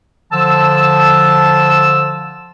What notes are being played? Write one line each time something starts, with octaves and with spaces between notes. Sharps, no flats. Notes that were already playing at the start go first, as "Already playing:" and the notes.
D3 F3 A5 E6